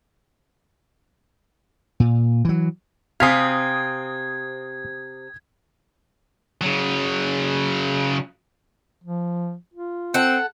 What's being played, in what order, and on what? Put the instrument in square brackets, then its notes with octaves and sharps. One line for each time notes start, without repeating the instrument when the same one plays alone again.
[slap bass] A#2
E3 F#3
[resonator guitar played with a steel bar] C3 C4 [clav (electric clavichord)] F5 G#5 [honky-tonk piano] D#6 B6 C7 [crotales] G#6
[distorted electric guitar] C#3 F#3
[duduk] F3
F4
[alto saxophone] C4 [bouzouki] A4 F#5